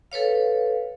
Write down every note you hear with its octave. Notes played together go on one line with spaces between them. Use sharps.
A4 B4 C#5 F5